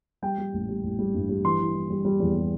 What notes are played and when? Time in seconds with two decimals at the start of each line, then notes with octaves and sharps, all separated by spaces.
0.22 G3 G5
0.38 G3
0.53 A1
0.69 G3
0.83 A1
0.99 G3
1.14 G2
1.29 G3
1.44 E3 C6
1.60 E3
1.75 G3
1.90 G3
2.05 G3
2.20 E2
2.35 G3